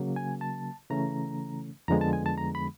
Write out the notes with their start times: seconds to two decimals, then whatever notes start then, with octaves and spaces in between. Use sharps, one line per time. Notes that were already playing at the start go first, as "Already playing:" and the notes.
Already playing: C#3 F#3 A#3
0.16 G#5
0.41 A5
0.90 C#3 E3 A3 C#4 A#5
1.88 F2 D3 F3 G#3 B3 A#5
2.01 A5
2.13 G#5
2.26 A5
2.38 A#5
2.55 B5